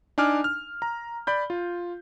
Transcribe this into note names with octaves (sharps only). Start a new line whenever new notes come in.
D4 D#4 G#5 D6 F6
F6
A#5
D5 B5 G6
F4